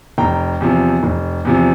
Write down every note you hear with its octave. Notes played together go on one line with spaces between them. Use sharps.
F1 G5 A#5
E2 C3 F3
F1
E2 C3 F3